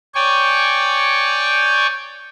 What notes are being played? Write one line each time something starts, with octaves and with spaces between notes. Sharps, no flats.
C#5 D5 G5 G#5 C#6